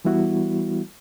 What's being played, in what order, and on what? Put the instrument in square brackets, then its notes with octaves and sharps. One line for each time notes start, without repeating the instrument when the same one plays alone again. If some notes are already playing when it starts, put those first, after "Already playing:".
[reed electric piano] E3 G3 B3 E4 F#4